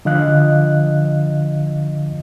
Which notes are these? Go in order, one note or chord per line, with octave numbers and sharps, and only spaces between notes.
D3 F3 D#5 F5 F#6